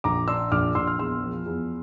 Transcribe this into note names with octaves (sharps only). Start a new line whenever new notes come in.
A#1 A#5 D6
D4 C6 E6
A#1 D6 F6
A#1 C6 E6
F6
E2 C6 E6
F3
E2